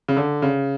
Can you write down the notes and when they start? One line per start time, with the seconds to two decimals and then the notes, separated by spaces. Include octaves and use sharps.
0.08 C#3
0.17 D3
0.42 C#3